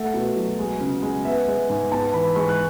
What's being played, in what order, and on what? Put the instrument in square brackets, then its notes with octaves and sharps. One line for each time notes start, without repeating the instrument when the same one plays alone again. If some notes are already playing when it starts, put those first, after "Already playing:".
Already playing: [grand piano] A3 F#5
B2
F#3
G#3
C#3
G#3
B3 E5
G#3 E5
G#2 G#5
B3 A5
E3 B5
G#3 C#6
F#6